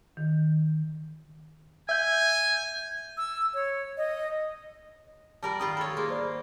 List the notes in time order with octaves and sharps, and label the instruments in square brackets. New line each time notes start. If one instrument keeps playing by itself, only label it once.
[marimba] D#3
[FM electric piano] E5 G6 [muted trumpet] G#5
[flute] E6
C#5
D#5
[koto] G3 A#4 D5 [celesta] A5 A#5
[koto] D#3 G3 F4 [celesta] B5 D#6
[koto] A4 C#5
[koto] A#3 [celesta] G#4 C6
[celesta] C5 D5 B5